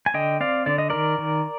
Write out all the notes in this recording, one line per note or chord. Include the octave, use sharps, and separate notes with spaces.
G#5
D3 D#5 G5
C4 D5 F5
D3 D5
D#5
D#3 A#4 D5
D#3